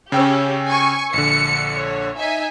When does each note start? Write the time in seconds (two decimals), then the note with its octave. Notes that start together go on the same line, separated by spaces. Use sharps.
0.12 C#3 C#4 G4 G5 E6
0.68 G#5 C#6
1.14 A#1 D3 C#7
1.76 C#5
2.17 D#4 E5 G#5